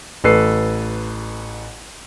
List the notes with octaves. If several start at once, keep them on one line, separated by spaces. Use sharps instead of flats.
A1 A4 B4 C7